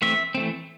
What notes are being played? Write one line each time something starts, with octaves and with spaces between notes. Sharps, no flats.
E3 A3 C4 E5
E3 A3 C4